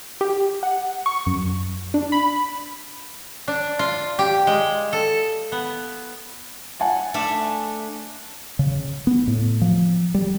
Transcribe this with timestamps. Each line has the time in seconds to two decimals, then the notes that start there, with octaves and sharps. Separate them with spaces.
0.21 G4
0.63 F#5
1.06 C#6
1.26 F#2
1.94 D4
2.12 B5
3.48 D4
3.79 F4
4.19 G4
4.47 G#3
4.93 A4
5.52 B3
6.80 F#5 G#5 A5
7.14 A3 D4 E5
8.59 C#3
9.07 B3
9.28 A2
9.61 F3
10.15 G3